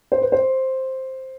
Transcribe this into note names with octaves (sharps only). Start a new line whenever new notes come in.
C5
B4
C5